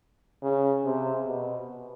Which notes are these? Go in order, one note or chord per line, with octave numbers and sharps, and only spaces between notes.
C#3
C3
B2